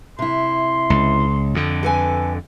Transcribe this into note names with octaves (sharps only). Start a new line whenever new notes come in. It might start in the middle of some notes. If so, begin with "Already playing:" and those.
C3 E4 C6
C#2
F2 D3
A4 B4 G#5